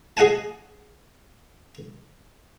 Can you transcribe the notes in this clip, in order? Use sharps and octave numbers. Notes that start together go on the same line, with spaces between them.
G#4 D#5 F#5 G#5 A5